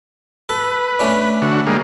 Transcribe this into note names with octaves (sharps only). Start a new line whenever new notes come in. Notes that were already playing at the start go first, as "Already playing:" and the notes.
A4 B4
A3 C#4 D4
D3 F#4
G3 G#3 A#3